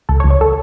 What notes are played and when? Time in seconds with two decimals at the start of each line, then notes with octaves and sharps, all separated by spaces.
0.09 C#2 A4
0.20 C#5
0.24 C#2
0.30 C#5
0.41 A4